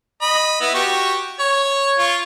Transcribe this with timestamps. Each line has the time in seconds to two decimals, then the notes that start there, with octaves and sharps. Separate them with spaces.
0.22 D#5 B5
0.61 B3 E4
0.74 F#4 G4 C#6
1.39 C#5
1.99 F4 C#6